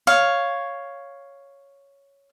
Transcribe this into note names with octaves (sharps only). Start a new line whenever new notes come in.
C#5 F5